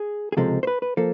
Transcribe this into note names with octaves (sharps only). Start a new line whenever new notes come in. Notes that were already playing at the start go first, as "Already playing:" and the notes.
Already playing: G#4
G#4
C#2 C3 F3 G#3 A4
C5
B4
B4
F3 A#3 A4